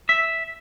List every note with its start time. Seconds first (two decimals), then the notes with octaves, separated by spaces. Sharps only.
0.09 E5